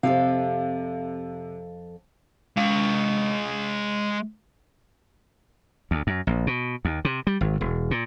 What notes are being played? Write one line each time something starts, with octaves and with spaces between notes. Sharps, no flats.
F2 C3 A4 F5
G#3 F5
D2
F#2
A#1
B2
D#2
C3
G3
G#1
E1
A#2